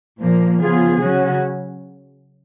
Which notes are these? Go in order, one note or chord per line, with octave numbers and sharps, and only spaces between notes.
A#2 F3 A#3
C#3 F3 B3 F4 G#4
C#3 F#3 C#4 F#4